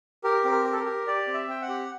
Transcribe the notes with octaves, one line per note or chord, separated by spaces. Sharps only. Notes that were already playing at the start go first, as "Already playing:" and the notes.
G4 A#4
C4
A#4
G4
A4
A#4
G4
G4 D5
C4
E5
C4 G5
F#5
G4